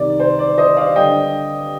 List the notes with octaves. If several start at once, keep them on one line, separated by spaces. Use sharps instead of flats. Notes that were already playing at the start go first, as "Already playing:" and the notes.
Already playing: C2 C3 D#3 D5
C5
D5
C5 D#5
D5 F5
G2 D3 D#5 G5